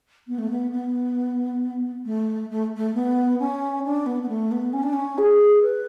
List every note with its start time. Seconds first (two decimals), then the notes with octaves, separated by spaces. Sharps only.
0.27 B3
0.38 A3
0.50 B3
0.71 B3
2.05 A3
2.50 A3
2.76 A3
2.94 B3
3.39 C#4
3.84 D4
4.06 B3
4.22 B3
4.28 A3
4.51 B3
4.73 C#4
4.83 D4
4.92 C#4
5.18 G#4
5.62 B4